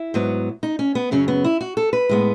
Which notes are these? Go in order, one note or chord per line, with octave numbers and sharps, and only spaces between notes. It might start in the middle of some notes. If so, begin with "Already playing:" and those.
Already playing: E4
G#2 F#3 B3
D#4
C#4
B3
F#2 C#3 F#3 C#4
B3
E4
F#4
A4
B4
A2 G#3 B3